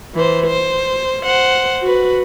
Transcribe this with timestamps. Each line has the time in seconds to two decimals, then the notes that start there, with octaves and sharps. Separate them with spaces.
0.14 E3 C5
0.47 C5
1.22 C5 F#5
1.82 F#4 B4